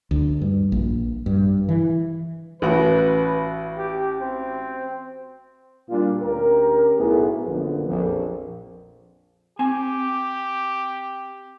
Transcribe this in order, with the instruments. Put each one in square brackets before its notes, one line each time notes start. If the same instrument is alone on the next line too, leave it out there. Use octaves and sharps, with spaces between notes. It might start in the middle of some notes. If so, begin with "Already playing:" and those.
[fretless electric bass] D2
G2
A#1
G2
E3
[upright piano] A1 F#4 [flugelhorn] B4
[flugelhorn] G4
C4
[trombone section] A#2 G3 D4 F4
D2 C#4 G4 A#4
B1 A2 B3 E4 G#4
A#1 F#2 D3 F3 B3 B4
A#1 F2 F3
[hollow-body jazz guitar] C4 G#5 [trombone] G4